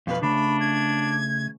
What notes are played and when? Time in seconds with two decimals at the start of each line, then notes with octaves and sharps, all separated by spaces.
0.07 F2 B2 B4 F5
0.22 C#3 A3 D4 B5
0.60 G#6